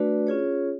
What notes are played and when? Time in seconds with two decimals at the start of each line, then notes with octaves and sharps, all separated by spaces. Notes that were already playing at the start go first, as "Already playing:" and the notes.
Already playing: A3 D4 F#4 B4 D5
0.27 C#4 F4 G#4 C#5